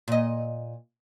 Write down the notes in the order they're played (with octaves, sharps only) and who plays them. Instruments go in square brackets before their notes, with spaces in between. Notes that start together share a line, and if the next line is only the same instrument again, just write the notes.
[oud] A#2 D#5